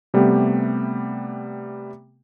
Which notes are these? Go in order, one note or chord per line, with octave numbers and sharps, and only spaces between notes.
C3 G3 A3 B3 G4